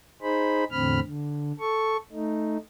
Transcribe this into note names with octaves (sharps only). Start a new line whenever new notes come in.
D#4 G#4 C5 B5
E2 A2 D3 C4 B5 F6
D3
A4 C#6
A3 D#4